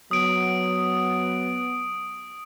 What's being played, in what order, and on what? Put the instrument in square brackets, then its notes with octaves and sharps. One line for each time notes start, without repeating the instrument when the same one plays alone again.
[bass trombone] F#3 [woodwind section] B3 [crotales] D#6 D7